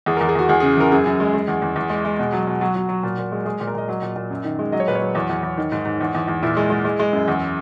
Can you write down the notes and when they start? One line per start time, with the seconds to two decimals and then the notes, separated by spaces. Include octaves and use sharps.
0.06 E2 G#4
0.17 A#4
0.21 E2
0.29 G#4
0.35 E2 F#4
0.49 E2 G#4
0.60 C#3 G#4
0.77 E3 A#4
0.92 F#2 G#4
1.06 F#2
1.20 G#3
1.34 G#3
1.48 E2
1.62 E2
1.76 E2
1.90 G#3
2.05 G#3
2.19 B2
2.32 F#3
2.47 B2
2.61 F#3 F#4
2.75 F#3
2.89 F#3
3.03 A#2
3.18 A#2
3.32 G#3
3.45 G#3 G#4
3.60 A#2
3.67 A#4
3.74 A#2 D#5
3.88 F#3 D#5
4.02 A#2
4.16 A#2
4.30 F#2
4.45 D#3
4.59 G#3
4.72 F#3 D#5
4.80 C#5
4.88 A#2 B4
4.95 C#5
5.01 F#3
5.15 E2
5.30 E2
5.43 E2
5.57 D#3
5.72 G#2
5.85 G#2
6.01 E2
6.15 E2
6.28 E2
6.43 A#2 E4
6.57 G#3
6.70 G#3
6.85 G#3
7.00 G#3
7.13 F#2
7.28 E2